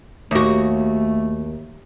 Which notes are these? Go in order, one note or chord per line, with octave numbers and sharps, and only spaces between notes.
D#2 A3 F#4